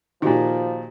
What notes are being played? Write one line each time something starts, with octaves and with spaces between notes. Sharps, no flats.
A#2 D#3 F3 F#4 G4